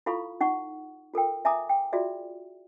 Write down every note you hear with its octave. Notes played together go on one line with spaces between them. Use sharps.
E4 F4 A4 F5 B5 C#6
D#4 F#5 C#6
F4 A4 A#4 G5
E5 G#5 A#5 D6 D#6
G5
F4 F#4 G#4 D5 E5